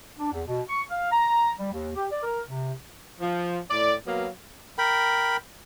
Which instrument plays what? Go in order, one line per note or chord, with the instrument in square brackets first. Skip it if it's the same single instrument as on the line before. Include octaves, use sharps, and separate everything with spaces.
[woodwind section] D4
E2
B2
C#6
F5
A#5
G3
D#2
G4
D5
A#4
C3
[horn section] F3
A2 D5
B2 F#3 A#3 B3 F5
[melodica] A#4 G5 B5